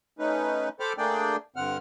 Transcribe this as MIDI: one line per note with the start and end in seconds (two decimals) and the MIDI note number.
0.19 0.69 57
0.19 0.69 61
0.19 0.69 63
0.19 0.69 71
0.80 0.93 69
0.80 0.93 72
0.80 0.93 79
0.80 0.93 83
0.80 0.93 86
0.80 0.93 89
0.98 1.36 57
0.98 1.36 58
0.98 1.36 62
0.98 1.36 68
0.98 1.36 74
0.98 1.36 79
1.56 1.78 43
1.56 1.78 50
1.56 1.78 60
1.56 1.78 78
1.56 1.78 89